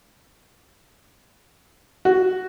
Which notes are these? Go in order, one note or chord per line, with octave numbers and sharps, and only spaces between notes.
F#4